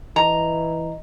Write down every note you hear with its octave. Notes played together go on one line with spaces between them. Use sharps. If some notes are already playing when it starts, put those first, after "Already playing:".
E3 D#5 A#5